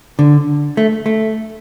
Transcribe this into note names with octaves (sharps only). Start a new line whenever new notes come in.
D3
A3
A3